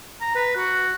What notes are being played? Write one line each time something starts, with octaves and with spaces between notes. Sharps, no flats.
A#5
B4
F#4